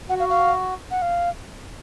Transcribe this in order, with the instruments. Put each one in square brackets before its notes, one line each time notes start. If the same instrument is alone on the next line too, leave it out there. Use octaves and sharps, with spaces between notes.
[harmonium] F#4 [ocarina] F#5
[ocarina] F5
F5
F#5
F5